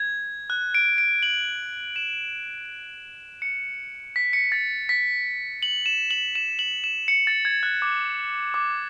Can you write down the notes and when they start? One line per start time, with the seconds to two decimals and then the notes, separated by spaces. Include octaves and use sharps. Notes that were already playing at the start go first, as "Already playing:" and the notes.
Already playing: G#6
0.50 F#6
0.75 D7
0.98 D7
1.23 F#7
1.96 E7
3.42 C#7
4.16 B6
4.33 C#7
4.52 A6
4.89 B6
5.63 F#7
5.86 E7
6.11 F#7
6.35 E7
6.59 F#7
6.84 E7
7.08 C#7
7.27 A6
7.45 G#6
7.63 F#6
7.82 D6
8.54 D6